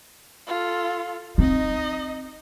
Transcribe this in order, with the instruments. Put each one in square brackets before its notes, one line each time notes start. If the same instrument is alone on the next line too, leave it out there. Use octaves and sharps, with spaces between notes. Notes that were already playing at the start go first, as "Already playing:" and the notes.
[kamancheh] F4 A4
[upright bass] C4 [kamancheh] D#4 D#5